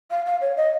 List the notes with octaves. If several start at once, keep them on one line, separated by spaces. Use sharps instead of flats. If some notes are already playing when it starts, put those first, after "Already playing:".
F5
F5
C#5
D#5